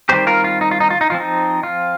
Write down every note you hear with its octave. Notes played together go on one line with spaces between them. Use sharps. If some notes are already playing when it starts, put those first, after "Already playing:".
D#3 G3 C4 G4 C5
F4 A#4
F4
D#4
F4
D#4
F4
D#4
F3 C4 F4
D#4
F4